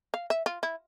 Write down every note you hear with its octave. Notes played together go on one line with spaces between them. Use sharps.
F5
E5
F4
E4